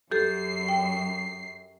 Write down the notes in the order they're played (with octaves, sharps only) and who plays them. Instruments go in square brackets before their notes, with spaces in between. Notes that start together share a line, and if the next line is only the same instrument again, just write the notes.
[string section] F#2 C7 [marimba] G4 A4
[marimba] G5